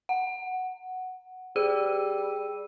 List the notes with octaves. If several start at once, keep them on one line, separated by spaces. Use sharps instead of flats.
F#5
G3 G#4 E6 D#7